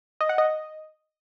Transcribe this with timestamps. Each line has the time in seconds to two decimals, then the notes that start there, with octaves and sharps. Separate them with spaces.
0.21 D#5
0.29 F#5
0.38 D#5